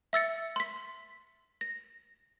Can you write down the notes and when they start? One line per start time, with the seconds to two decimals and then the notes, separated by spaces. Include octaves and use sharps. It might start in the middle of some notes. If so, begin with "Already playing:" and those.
0.13 E5 E6 A6 C#7
0.56 C6 B6
1.61 A#6